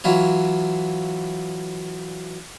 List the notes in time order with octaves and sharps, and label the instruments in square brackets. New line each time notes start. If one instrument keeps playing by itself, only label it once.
[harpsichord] E3 F#3 E4 F4 C#5